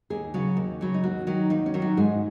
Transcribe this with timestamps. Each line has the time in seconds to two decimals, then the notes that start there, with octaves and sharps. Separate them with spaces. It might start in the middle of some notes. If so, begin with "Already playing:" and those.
0.10 D#2 G#4
0.34 C#3 F#3
0.57 D#2
0.81 C#3 F#3
0.94 D#4
1.04 D#2 F#4
1.27 D#3 F#3
1.50 D#2 D#4
1.66 C#4
1.74 D#3 F#3
1.82 F#4
1.97 G#2 G#4